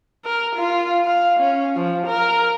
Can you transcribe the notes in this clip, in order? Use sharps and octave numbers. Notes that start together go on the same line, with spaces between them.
A#4
F4
F5
C#4
F3
A#4